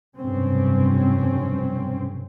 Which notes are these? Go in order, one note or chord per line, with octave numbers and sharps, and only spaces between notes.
F1 B1 G2 C3 C4 C#4